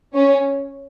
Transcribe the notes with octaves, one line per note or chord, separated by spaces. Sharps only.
C#4